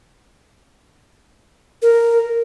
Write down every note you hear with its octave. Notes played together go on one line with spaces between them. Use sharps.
A#4